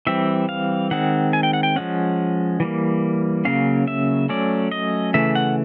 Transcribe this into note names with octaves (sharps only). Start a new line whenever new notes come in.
E3 G3 C4 E5
F5
D#3 G#3 C4 F#5
G#5
G5
F#5
G5
F3 G#3 C#4 F#5
E3 G3 A#3
C#3 F#3 A#3 C#4 F5
E5
F#3 A3 C#4 D5
D#5
C#3 E3 A3 E5
F#5